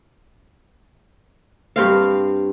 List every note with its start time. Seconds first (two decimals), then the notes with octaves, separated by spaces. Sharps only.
1.76 G2 C4 F5